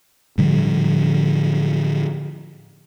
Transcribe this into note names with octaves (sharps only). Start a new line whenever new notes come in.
A2 D3 F3 G3